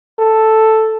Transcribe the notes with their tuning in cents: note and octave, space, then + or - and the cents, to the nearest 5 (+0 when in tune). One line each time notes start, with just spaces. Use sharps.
A4 +0